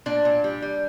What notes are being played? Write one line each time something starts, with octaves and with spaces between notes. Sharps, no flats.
A#2 D4
A#2
G3
G3